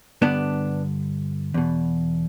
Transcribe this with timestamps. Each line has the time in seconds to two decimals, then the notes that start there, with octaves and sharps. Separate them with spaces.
0.22 G2 D3 B3 D4
1.54 E2 B2